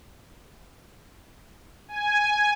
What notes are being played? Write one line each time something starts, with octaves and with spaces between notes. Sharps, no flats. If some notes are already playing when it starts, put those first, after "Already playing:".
G#5